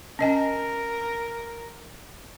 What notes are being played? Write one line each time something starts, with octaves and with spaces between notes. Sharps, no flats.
C#4 A#4 D#5 G#5